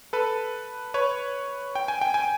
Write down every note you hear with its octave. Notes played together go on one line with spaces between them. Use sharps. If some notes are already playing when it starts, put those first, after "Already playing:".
A4 B4
B4 C#5
G5
G#5
G5
G#5